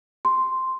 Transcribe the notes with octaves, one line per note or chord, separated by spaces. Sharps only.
C6